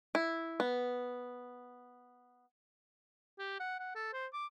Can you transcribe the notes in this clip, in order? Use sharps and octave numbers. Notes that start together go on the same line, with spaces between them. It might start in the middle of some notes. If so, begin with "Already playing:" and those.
E4
B3
G4
F#5
F#5
A4
C5
D6